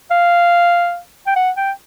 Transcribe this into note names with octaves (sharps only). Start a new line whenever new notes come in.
F5
G5
F#5
G5